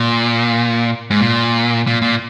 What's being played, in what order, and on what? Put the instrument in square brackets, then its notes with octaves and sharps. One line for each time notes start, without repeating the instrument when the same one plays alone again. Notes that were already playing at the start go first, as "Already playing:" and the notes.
Already playing: [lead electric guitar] A#2
G#2
A#2
A#2
A#2